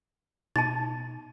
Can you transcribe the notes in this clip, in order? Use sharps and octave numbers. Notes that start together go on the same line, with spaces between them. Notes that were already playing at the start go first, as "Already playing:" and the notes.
B2 D#4 A5 A6